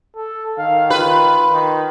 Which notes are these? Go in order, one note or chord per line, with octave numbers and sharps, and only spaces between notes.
A4
D#3 F5
F4 B4
D#3